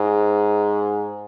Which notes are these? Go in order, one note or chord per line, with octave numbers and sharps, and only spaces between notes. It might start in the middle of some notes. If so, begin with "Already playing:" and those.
Already playing: G#2